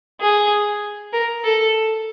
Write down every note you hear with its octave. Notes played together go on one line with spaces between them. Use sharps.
G#4
A#4
A4